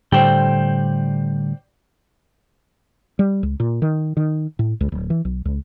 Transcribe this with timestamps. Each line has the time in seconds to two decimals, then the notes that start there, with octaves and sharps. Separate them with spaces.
0.12 A2 D3 G3 C5 D5 G5
3.19 G3
3.43 C#2
3.60 A#2
3.82 D#3
4.17 D#3
4.59 A2
4.81 C#2
4.92 D1
5.10 E3
5.25 B1
5.45 C#2